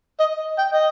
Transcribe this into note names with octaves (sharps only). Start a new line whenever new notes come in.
D#5
G5
D#5